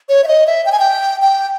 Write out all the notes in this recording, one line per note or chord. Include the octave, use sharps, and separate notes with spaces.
C#5
E5
D#5
E5
G5
G#5
G5
G5